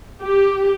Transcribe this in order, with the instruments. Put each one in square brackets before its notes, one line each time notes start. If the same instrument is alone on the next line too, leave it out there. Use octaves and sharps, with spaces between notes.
[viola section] G4